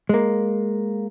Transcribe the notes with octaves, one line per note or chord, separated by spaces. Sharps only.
G#3 A#3